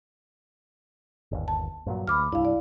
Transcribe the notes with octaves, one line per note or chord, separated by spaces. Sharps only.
G1 D#2
A5
G2 A#2 F#3
D2 B5 D6 F6
C2 G2 E4 F5
D5